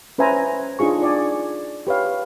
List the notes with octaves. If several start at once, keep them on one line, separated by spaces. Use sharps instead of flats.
C#4 B4 C5 E5 G#5 A#5
D4 D#4 F4 G#4 C#6
D5 G#5
G4 B4 C#5 F5